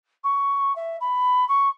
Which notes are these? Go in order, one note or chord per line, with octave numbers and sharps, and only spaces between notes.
C#6
E5
B5
C#6